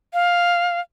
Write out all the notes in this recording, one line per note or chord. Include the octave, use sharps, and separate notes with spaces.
F5